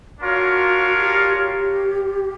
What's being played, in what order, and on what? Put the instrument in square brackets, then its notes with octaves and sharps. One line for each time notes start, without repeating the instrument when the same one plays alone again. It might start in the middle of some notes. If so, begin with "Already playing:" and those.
[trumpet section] D4 F4 A#4 C#5 F5 [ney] F#4
[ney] G4
G4